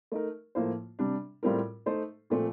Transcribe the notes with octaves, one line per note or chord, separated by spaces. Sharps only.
A3 D#4 A#4
A2 F3 A#3 F4 C5
C3 G3 D4
A2 G3 C4 F4 A#4
A3 D#4 A4 C5
A#2 F3 A3 C4